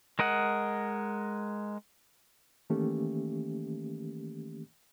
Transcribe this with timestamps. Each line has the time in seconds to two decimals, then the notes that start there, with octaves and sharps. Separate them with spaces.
0.19 G#3 A#4 D#5 F#5
2.70 D#3 E3 A3 A#3 C#4 G4